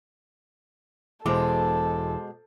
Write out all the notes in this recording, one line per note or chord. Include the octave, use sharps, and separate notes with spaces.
E1 B2 E3 G#3 A4 C5 D6